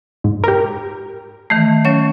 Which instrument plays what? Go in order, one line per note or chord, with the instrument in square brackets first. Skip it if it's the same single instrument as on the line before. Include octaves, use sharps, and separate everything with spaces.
[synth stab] G#2
G4 A#4
[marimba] D#3 E3 A3
F#3 C#4 C#5